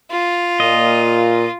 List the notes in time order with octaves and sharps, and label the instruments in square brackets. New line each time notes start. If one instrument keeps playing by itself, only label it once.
[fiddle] F4
[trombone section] A#2 [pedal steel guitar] D#5